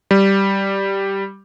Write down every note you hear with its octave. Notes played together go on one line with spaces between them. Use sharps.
G3